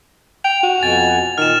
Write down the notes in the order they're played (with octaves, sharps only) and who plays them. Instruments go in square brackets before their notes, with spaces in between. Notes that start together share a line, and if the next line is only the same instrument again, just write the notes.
[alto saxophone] G5 [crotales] F7
[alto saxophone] F#4
[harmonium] F2 B2 G#5 [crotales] A6 F7
[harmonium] A#2 [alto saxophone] D#3 [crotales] F6 E7